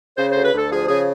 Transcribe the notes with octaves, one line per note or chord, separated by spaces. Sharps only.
C#3 C5
C5
D2
B4
D2
A4
F3 G#4
C#3 G#4